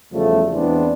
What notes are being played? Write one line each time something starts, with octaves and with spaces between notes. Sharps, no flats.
E2 C#3 F3 G3 A3
E2 E3 G#3 B3 C4 D4